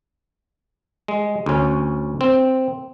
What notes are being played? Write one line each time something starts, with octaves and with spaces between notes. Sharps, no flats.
G#3
D2 C#4
C4